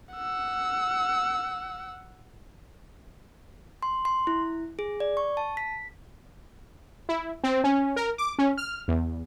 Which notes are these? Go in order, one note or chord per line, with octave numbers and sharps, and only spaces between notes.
F#5 E6
C6
C6
E4
G#4
D5
C#6
A5
B6
E4
C4
C#4
A#4
D6
C#4
F6
E2